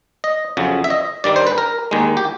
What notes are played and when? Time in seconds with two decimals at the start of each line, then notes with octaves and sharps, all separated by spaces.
0.24 D#5
0.57 F2 C#3 F#3
0.84 E5
0.90 D#5
1.24 G2 D#3 G3 D5
1.36 C5
1.47 B4
1.58 A#4
1.91 D#2 D#3 G#3
2.17 G4